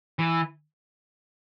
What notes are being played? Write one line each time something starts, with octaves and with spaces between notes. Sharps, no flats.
E3